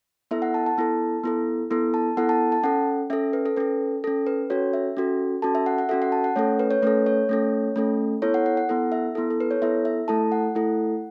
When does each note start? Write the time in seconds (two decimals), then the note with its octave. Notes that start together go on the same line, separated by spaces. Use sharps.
0.31 B3 E4 A4 E5
0.42 F#5
0.54 A5
0.66 A5
0.78 B3 E4 A4
1.24 B3 E4 A4
1.71 B3 E4 A4
1.94 A5
2.17 B3 E4 A4 F#5
2.29 A5
2.52 A5
2.63 C#4 A4 F#5
3.10 C#4 A4 E5
3.33 B4
3.46 A4
3.56 C#4 A4 B4
4.04 C#4 A4
4.27 B4
4.50 C#4 F#4 A4 C#5
4.73 E5
4.97 C#4 F#4 A4
5.42 C#4 F#4 A4 A5
5.55 E5
5.66 F#5
5.78 F#5
5.89 C#4 F#4 A4 E5
6.02 F#5
6.12 A5
6.24 F#5
6.36 A3 C#4 A4 C#5
6.59 B4
6.71 C#5
6.82 A3 C#4 A4 B4
7.06 C#5
7.29 A3 C#4 A4
7.76 A3 C#4 A4
8.22 B3 E4 A4 C#5
8.34 F#5
8.46 F#5
8.57 F#5
8.69 B3 E4 A4 F#5
8.92 E5
9.15 B3 E4 A4
9.30 A4
9.40 B4
9.51 C#5
9.62 B3 E4 A4 E5
9.85 E5
10.08 A3 E4 A4 A5
10.32 F#5
10.55 A3 E4 A4